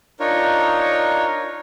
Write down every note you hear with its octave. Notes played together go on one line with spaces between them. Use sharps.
D4 D#4 F4 A#4 C#5